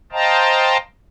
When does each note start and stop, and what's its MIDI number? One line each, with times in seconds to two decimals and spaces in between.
0.12 0.77 72
0.12 0.77 75
0.12 0.77 77
0.12 0.77 79
0.12 0.77 81
0.12 0.77 82